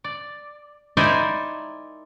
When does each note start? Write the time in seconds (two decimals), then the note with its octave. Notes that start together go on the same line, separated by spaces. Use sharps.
0.04 D5
0.97 D#4 E4 A#4 C5 D5 G#5